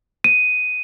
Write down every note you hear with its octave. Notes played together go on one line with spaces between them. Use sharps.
D#7